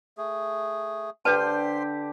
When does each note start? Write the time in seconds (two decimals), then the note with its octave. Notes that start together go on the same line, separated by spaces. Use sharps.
0.18 A3 G#4
1.25 D3 G4 B4 C5 A5 C6